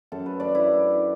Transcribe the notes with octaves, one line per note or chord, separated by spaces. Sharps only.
F#2 A4
B4
D4 D5
E4